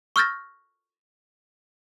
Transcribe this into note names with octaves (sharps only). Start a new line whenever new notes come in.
C#6 E6 F6 G6 A6 A#6